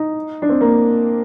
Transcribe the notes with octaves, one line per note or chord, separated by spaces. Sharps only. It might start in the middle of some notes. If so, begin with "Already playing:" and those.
Already playing: D#4
D4
C4
A#3